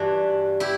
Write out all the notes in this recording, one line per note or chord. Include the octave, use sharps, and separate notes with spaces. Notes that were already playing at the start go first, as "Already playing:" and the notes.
Already playing: G2 E3 D4 F#4
E4 G4